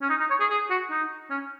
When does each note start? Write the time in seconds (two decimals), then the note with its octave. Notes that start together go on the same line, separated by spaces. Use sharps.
0.02 C#4
0.10 D#4
0.20 D#4
0.30 C#5
0.40 G#4
0.50 G#4
0.70 F#4
0.91 D#4
1.30 C#4